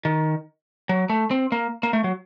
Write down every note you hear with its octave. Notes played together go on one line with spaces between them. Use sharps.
D#3
F#3
A3
C4
A#3
A#3
A3
F#3